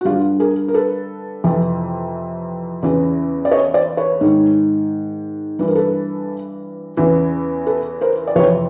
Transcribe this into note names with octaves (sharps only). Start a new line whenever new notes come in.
F#4
G2 D3 F4 G4
G#4 A#4
A#4
A4 B4
F2 C3 E3
E2 C#3 E3
D5
C#5 D#5
C5 D5
B4 C#5
G#2 D#3
G2 E3 B4
A#4
A4 B4
E2 C#3 E3
A4 B4
A#4 C5
D5
F2 C3 E3 B4 C#5